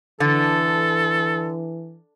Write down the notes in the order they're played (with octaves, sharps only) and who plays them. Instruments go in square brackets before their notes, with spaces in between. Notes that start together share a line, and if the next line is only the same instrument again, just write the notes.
[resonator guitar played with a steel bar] D3 [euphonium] E3 [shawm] A4